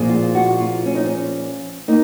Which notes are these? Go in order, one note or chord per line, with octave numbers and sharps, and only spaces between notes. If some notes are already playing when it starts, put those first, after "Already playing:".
Already playing: A#2 F3 G#3
F4
F#4
F4
C#4
D#4
C#4
A#3 D#4